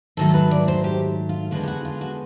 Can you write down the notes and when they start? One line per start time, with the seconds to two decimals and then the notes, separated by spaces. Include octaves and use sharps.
0.17 G#2 D#3 F#3 A3 A4
0.34 B4
0.51 D5
0.68 C5
0.84 G4
1.29 F4
1.51 D3 F3 G#3 B3 F#4
1.63 G4
1.68 F#4
1.85 F4
2.01 F#4